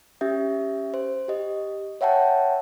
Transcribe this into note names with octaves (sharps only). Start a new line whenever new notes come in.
C#4 G4 E5
C5
G4 D#5
C#5 E5 F#5 G5 A5